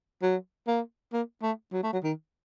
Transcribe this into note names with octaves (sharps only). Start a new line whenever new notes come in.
F#3
A#3
A#3
A3
F#3
A3
F#3
D#3